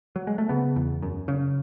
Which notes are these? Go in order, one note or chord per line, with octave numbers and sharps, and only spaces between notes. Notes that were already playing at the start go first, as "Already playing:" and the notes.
F#3
G#3
A3
C#3 B3
E2
F#2
C#3